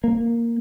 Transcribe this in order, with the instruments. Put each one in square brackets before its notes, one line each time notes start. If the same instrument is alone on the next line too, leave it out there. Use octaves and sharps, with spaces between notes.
[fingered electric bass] A#3